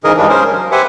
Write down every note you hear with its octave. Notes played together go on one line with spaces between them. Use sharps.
G#2 C#3 E3 G#4 A#4 D#5
G2 C#3 E3 G#3 D4
C#4 G#4 A#4 C5
F#3
G4 B4 C5 E5 F#5 G#5